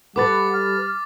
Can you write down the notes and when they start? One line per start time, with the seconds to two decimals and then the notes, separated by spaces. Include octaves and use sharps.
0.16 G3 A4 B4 F#5 D6 A6
0.53 F6